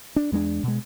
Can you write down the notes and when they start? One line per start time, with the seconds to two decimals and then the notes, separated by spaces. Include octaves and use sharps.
0.16 D4
0.32 E2 G#3 A3 D4
0.63 B2 G#3